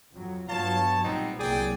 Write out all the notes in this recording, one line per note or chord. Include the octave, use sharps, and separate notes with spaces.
F2 F#3
G2 F#3 B3 F4 C#5 A5
B1 A#2 G3 B3 C4 D#4
C2 F#3 A#3 G#4 D5 G5